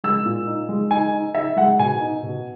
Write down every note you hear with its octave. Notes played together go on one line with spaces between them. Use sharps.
G#3 E6
A#2
D#4
G#3
D#4 G#5
D#4
D#4 E5
G#3 F#5
B2 G#5
D#4
B2